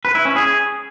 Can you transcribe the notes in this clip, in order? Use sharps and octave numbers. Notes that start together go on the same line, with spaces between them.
B4
E4
C#4
G#4